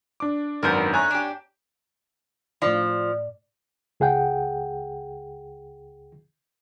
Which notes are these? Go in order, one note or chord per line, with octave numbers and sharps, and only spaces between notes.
D4 D6
G#1 F#2 B3 D4 A#4 G6
A3 C#5 G#5 A#5 F#6
D4 G4
A2 F3 D5
C#2 G#4 F#5 G5